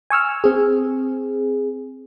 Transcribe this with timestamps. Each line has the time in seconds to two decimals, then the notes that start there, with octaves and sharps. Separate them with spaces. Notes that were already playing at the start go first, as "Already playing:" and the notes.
0.10 G#5 C#6 E6 F6
0.44 C4 G#4